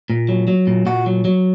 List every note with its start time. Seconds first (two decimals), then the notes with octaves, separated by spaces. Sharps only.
0.10 A#2
0.29 F#3
0.48 F#3
0.67 A#2
0.86 A#2 F#4
1.06 F#3
1.25 F#3